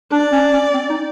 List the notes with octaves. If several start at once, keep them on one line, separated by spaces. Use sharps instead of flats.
D4 D5
C#4
C#4
C4
D#4